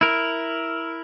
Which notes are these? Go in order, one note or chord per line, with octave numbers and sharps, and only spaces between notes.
E4 A#4